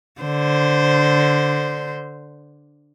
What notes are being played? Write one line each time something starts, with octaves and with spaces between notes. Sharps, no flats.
D3 C5